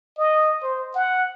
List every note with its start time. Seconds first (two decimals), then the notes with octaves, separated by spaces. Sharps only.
0.18 D#5
0.62 C5
0.95 F#5